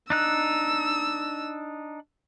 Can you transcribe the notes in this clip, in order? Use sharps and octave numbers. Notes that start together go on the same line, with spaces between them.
D4 D#4 E6 F#6